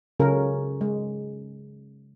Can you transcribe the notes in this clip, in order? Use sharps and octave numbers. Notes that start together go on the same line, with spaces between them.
C#3 F#3 C#4 F4 A4 A#4
G#3